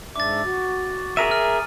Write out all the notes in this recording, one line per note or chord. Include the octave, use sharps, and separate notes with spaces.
G#2 D4 E5 D6 A6
F#4
G#4 A#4 E5 D#7
F6